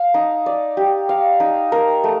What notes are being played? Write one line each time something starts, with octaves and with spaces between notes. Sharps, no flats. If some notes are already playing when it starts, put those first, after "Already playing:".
Already playing: F5
D#4
D5
G4
F5
D#4
A#4
A3